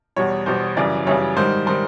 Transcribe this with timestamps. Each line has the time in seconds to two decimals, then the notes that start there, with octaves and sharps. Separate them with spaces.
0.16 E2 B2 G3 C#5
0.46 E2 B2 G3 C5
0.76 F#2 C#3 E3 G3 D5
1.07 F#2 C#3 E3 G3 C#5
1.37 G#2 D#3 G3 C5
1.67 D#3 G3 C5